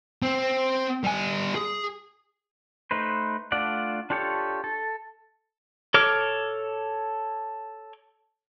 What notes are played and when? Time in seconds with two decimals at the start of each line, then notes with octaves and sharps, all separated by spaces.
0.22 C4
1.04 G3 G#5
1.55 G#4
2.91 A3 D#4 B4 C5
3.52 A3 D4 F4 D5 F#5
4.10 D4 F4 G4 A4 C#5
4.64 A4
5.94 A4 C#5 D6 F6